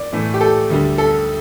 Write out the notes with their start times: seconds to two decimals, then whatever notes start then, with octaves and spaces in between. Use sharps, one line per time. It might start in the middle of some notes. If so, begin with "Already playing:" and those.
Already playing: D5
0.12 A2 E3 A3
0.34 G4
0.41 A4
0.70 D2 D3 G3
0.98 A4